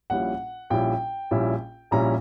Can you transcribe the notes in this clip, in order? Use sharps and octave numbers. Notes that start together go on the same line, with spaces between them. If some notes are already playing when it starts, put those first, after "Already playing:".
A#1 A#2 G3 C#4 E4 F#5
A#1 A#2 G3 C#4 E4 G5
A#1 A#2 G3 C#4 E4
A#1 A#2 G3 C#4 E4 A#5